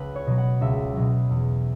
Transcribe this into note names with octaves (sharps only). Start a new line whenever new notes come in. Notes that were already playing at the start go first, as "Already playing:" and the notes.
Already playing: C#2 B4
C#5
B2 F#3
F#5
C#2 E5
B2 F#3
E2